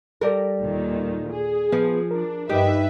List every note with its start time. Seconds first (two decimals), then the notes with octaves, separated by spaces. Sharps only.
0.21 G3 A4 A#4 D5
0.61 D#2 A#2 D#3
1.32 G#4
1.72 F3 B3 B4
2.11 D4 A#4
2.49 G2 D#4 G4 B4 E5